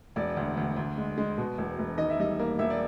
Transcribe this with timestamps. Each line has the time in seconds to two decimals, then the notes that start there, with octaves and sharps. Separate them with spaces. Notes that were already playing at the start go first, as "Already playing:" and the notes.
0.16 E1 D5
0.37 D2
0.57 D2
0.76 D2
0.98 G#3
1.18 G#3
1.38 B2
1.58 E1
1.79 E1
1.98 D#3 D#5
2.10 E5
2.19 G3 D#5
2.39 A#3
2.59 E1 E5
2.70 D5